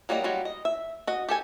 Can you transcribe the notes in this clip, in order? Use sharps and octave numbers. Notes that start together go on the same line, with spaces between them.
F#3 G3 A#3 G#4 D#5
F#3 G3 F4
D#5
E5
F#4 D#5
G4 A4 G#5